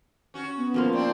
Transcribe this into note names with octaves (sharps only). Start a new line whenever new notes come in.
C#4 F#4
B3
F3 A#3 C5
C4 D4 D5